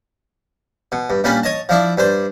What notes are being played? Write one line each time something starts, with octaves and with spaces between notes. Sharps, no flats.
B2
G2
A#2 G3 C#4 D4 B5
C#5 D#5 A5
F3 D4 E4
G2 D4 C5